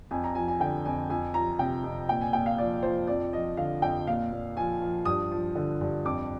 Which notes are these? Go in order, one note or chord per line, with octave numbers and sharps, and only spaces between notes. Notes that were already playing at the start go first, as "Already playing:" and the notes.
F2 G#5
A#5
F3 G#5
G#5
D3 G5
F2 G#5
F2 G#5
F3 A#5
C3 G5
F2
A#2 G5
G#5
A#2 G5
F5
F3 D5
F3 C5
F2 D5
F3 D#5
D3 F5
F2 G5
A#2 F5
A#2
F3 G#5
F3
G2 D#6
F3
D3
G2
F2 D6